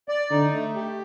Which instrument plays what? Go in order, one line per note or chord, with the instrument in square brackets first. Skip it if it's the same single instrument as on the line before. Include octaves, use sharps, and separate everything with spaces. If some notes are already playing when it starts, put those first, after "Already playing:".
[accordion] D5
[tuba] D3 [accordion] D#4
[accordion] A3
G4